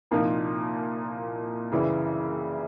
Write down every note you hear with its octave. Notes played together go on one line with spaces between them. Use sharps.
C2 A#2 F3 A#3 D#4
F#2 C#3 E3 G3